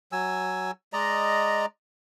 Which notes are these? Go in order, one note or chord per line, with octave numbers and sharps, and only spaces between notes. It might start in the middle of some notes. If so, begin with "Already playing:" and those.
F#3 G#5 E6
G#3 D5 D#5 A#5